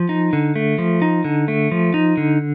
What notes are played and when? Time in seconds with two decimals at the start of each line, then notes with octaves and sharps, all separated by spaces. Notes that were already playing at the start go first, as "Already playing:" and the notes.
Already playing: F3
0.09 D#4
0.33 D3
0.56 A3
0.78 F3
1.02 D#4
1.24 D3
1.48 A3
1.71 F3
1.94 D#4
2.17 D3